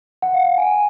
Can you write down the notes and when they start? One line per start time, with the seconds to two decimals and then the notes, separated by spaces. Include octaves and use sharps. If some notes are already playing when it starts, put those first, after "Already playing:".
0.22 F#5
0.34 F5
0.45 F#5
0.58 G#5